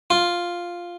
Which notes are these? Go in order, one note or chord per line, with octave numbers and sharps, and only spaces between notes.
F4